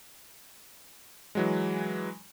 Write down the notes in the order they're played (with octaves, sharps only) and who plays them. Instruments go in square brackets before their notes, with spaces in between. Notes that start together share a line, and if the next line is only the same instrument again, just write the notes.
[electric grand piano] E3 F#3 G#3